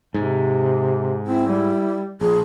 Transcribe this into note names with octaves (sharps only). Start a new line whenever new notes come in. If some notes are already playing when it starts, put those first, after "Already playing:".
G#2 C3
C4 E4
G3
A#1 A#2 G#4